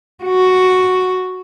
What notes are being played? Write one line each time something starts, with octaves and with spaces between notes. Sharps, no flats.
F#4